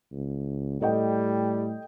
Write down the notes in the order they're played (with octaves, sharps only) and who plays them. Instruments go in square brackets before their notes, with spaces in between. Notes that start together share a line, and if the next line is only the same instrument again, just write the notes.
[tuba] C#2
[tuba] A2 [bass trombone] G3 [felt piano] A4 D#5 G5